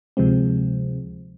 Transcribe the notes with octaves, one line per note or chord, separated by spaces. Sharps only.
D2 C3 F3 G#3 C4